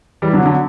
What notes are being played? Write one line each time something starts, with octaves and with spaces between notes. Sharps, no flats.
E3 G3
D3 F#3
D3 F#3